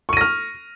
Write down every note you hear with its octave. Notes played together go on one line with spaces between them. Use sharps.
C#6 F6 A#6 D#7